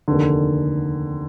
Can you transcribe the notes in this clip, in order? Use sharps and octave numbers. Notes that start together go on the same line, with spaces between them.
F1 D#2 D3